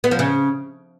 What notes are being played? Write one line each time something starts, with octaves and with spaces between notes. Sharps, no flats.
B3
F3
C#3